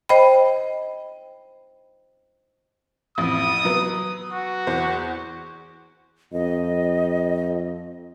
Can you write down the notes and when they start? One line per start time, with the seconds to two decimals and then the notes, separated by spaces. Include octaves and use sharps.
0.09 C5 D#5 G5 B5
3.18 A1 F2 D#6
3.65 F#3 B3
4.33 F#4
4.67 E2 C5
6.33 F2 D#5